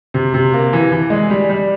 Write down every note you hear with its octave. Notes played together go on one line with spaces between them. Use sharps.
C3
C3
A#3
E3
E3
G#3
G3
G3